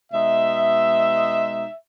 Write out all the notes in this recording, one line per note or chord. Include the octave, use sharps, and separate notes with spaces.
B2 G#3 D#4 E5